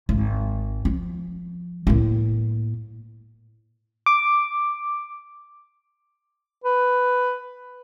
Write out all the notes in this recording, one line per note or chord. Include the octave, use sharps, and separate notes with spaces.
G#1
F3
A2 A#3
D6
B4